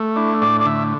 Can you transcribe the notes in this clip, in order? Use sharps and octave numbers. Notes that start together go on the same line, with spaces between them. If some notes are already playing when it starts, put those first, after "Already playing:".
Already playing: A3
D4 E4
A2 D5
D5
D3 E5